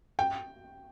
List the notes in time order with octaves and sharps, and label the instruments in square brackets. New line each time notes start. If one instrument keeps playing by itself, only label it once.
[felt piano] G5